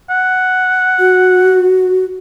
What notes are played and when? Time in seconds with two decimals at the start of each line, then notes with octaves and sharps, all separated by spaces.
0.10 F#5
0.99 F#4